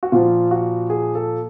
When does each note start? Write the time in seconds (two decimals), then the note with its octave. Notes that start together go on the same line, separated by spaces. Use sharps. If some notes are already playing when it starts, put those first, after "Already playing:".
0.03 F#4
0.12 A#2 F3 F4
0.51 F#4
0.90 G#4
1.15 A4